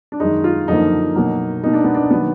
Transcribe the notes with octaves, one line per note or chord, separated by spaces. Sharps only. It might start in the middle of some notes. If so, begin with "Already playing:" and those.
D4
F#2 D#3 G#3 D#4
F4
F#2 D3 F3 A#3 D#4
B2 F#3 A#3
B2 A#3 D#4
D4
B3
D4
D#3 F#3 A#3 B3